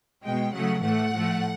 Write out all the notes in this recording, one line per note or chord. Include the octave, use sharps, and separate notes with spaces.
B2 G#3 G5
C#3 F#3 A3 F#5
A2 E3 A3 F#5
A2 F3 A3